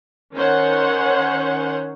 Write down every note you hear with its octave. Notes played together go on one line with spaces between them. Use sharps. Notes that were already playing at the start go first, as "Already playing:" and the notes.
D#3 C#4 C5 C#5 F#5